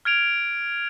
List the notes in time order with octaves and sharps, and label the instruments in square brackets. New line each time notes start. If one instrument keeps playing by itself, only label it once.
[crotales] F6 G#6 D7 F7